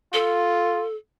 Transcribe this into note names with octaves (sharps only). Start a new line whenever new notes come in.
F4 A4